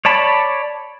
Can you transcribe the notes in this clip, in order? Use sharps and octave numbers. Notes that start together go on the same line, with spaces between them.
C#5 D5 A5 B5